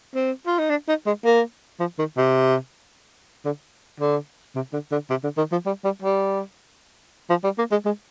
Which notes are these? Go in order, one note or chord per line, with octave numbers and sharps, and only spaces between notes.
C4
F4
D#4
D4
D#4
G#3
A#3
F3
D#3
C3
D3
D3
C3
D3
D3
C3
D3
D#3
F3
G3
G3
G3
F3
G3
A#3
G#3
G#3